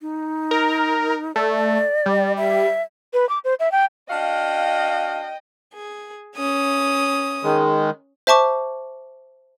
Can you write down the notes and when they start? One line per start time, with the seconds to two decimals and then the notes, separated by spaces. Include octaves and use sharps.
0.01 D#4
0.51 A#4
1.36 A3 D5
2.06 G3
2.37 E5
3.13 B4
3.29 D6
3.44 C5
3.60 E5
3.72 G5
4.10 D4 F#4 D#5 F5 G5
5.73 G#4
6.35 C#4 D#6
7.44 D#3 G#3
8.27 C5 E5 A5 C#6 D6